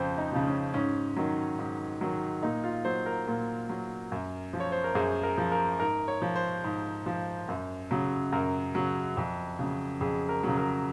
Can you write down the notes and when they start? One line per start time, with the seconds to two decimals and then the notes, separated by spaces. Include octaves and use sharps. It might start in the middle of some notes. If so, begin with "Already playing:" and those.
Already playing: F2 C#3 F3 C5
0.18 D#4
0.32 C#3 F3
0.47 C#4
0.74 G#2 C#4
1.17 D#3 F#3
1.59 G#2
2.01 D#3 F#3
2.43 A#2 D#4
2.64 F4
2.85 F#3 C5
3.06 A#4
3.27 A#2
3.69 F#3
4.12 F#2
4.53 F3
4.60 C#5
4.72 C5
4.84 A#4
4.95 F#2 G#4
5.23 A#4
5.38 F3
5.52 A#4
5.80 G#2 A#4
6.08 C#5
6.22 F3
6.36 C5
6.64 G#2
7.06 F3
7.49 F#2
7.91 C#3 F#3
8.32 F#2 A#4
8.75 C#3 F#3
9.17 F2
9.59 C#3 F#3
10.01 F2 G#4
10.29 A#4
10.43 C#3 F#3
10.57 A#4